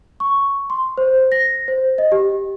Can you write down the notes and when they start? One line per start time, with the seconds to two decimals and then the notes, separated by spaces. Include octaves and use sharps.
0.20 C#6
0.70 C6
0.98 C5
1.32 A#6
1.68 C5
1.98 D#5
2.12 G4